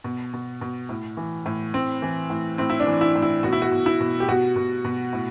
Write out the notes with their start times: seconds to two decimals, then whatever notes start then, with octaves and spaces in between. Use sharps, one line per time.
0.04 B2
0.33 B2
0.61 B2
0.89 A2
1.17 E3
1.46 A2
1.74 A2 C4
2.02 E3
2.30 A2
2.58 A2 C4
2.70 E4
2.80 D4
2.87 E3
3.01 E4
3.15 A2
3.22 E4
3.43 B2 F#4
3.53 E4
3.62 F#4
3.72 B2
3.86 E4
4.00 B2
4.20 G4
4.28 B2 F#4
4.56 B2
4.84 B2
5.13 A2